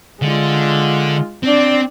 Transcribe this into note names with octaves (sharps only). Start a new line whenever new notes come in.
D3 G#3 F4
C4 D4 D5